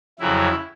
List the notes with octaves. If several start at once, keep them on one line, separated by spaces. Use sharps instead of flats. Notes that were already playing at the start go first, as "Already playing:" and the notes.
F2 C#3 F#3 E4